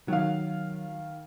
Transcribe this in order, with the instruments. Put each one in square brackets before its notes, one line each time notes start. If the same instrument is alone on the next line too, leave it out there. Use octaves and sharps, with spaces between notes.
[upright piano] D#3 F5 [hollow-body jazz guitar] F#3